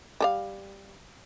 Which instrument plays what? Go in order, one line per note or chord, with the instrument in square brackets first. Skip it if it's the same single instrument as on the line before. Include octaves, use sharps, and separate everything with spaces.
[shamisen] G3 A4 F5